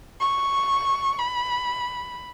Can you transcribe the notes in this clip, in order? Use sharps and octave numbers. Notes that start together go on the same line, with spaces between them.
C#6
B5